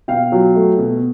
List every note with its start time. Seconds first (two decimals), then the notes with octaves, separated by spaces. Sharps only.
0.08 B2 F5 G5
0.32 F#3
0.55 A3
0.78 B2